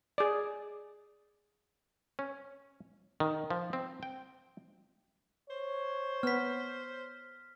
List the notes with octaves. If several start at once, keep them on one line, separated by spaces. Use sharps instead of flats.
G#4 D5
C#4
D#3
F3
C4
G5
C5 C#5
B3 F6 B6